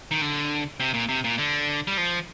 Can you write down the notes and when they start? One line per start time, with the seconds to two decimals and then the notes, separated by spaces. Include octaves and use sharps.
0.11 D#3
0.21 D3
0.80 C3
0.94 A#2
1.09 C3
1.24 A#2
1.38 D3
1.87 G3
1.97 F3